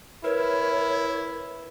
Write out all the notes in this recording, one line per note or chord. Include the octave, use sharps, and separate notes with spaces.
E4 A#4 B4 C#5